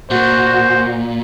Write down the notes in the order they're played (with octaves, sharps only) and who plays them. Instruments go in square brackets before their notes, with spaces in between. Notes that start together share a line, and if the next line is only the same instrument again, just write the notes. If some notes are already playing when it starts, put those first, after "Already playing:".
[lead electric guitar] A#2 [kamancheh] F#4 [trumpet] C5